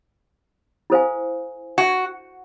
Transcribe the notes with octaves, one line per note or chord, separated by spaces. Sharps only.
E4 A4 C5 F5 G#5
F#4